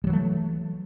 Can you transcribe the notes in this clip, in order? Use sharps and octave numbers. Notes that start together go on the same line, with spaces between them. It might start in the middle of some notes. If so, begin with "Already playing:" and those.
E3 F#3 G3 A3